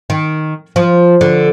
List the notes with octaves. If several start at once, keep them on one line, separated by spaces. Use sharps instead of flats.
D#3
F3
D3